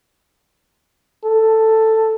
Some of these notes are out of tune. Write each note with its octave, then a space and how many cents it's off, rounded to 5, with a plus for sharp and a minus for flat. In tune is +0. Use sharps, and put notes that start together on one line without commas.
A4 +10